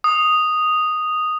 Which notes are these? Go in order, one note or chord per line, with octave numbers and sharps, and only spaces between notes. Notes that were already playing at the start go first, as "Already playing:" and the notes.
D#6